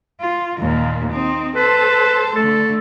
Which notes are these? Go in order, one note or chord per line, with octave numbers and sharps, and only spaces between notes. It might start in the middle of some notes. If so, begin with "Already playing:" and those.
F4
D#2 A#2 A#3
C4 D#4
A4 B4 C5 A5
D3 A3 A4